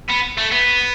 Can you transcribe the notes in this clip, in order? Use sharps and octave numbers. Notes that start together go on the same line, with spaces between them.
B3
A3
B3